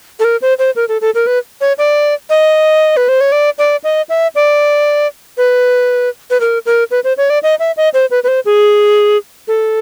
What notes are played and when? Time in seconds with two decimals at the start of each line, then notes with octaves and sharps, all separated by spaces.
0.20 A4
0.24 A#4
0.42 C5
0.59 C5
0.76 A#4
0.89 A4
1.01 A4
1.15 A#4
1.27 B4
1.61 C#5
1.78 D5
2.30 D#5
2.97 B4
3.09 C5
3.21 C#5
3.32 D5
3.58 D5
3.84 D#5
4.09 E5
4.35 D5
5.37 B4
6.30 B4
6.41 A#4
6.66 A#4
6.91 B4
7.04 C5
7.17 C#5
7.30 D5
7.43 D#5
7.60 E5
7.77 D#5
7.94 C5
8.11 B4
8.24 B4
8.28 C5
8.45 G#4
9.48 A4